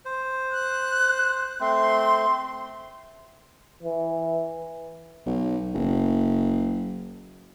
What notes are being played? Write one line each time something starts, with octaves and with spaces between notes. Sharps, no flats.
C5
F#6
A3 C4 C6
E3
B1
F#1